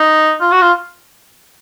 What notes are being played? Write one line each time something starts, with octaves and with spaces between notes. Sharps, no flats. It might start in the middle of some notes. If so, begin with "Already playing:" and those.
Already playing: D#4
F4
F#4
F4